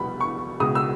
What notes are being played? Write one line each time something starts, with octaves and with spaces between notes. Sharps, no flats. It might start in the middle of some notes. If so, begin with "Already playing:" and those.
Already playing: F1 E2 B2 G3 B3 B5
C#6
C#2 B2 G#3 D#6
E6